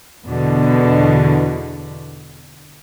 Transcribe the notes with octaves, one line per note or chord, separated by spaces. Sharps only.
E2 B2 D3